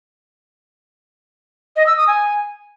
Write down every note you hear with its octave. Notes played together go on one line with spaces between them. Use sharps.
D#5
E6
D#6
G#5